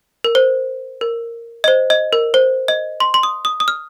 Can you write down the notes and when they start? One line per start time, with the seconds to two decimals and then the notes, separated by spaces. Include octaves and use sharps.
0.24 A#4
0.35 C5
1.01 A#4
1.64 D#5
1.68 C5
1.90 D#5
2.13 A#4
2.34 C5
2.68 D#5
3.00 C6
3.14 C6
3.23 D#6
3.45 D#6
3.60 D#6
3.68 F6